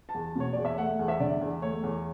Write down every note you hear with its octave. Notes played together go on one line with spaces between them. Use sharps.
A5
E2
B2 C#5
E2 D5
E5
A3 F#5
E2
E5
D3 D5
E2
A3 C#5
E2